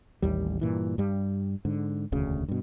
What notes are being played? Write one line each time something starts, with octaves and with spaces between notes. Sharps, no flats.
A1 D#2 G3
G2 A#2 E3
G2 G3
G#2 D3
E1 D2 C#3
G2 B2